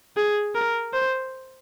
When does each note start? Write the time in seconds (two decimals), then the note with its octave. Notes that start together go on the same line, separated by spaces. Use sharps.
0.17 G#4
0.55 A#4
0.93 C5